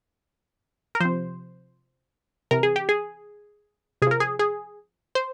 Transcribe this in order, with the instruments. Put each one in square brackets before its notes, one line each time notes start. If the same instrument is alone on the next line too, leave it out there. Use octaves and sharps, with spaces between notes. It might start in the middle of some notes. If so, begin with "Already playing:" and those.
[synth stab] A#4
C3 F3 C5
C3 E3 A#4
G#4
G4
G#4
C3 G#4
F3 A#4
G#4
G#4
C5